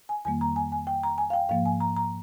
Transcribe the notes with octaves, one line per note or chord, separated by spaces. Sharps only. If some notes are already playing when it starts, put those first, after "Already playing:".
G#5
F2 D#3 G3 A#3 G#5
A#5
G#5
G#5
G5
A#5
G#5
F5
G5
G#2 F3 A#3 F5
G#5
A#5
A#5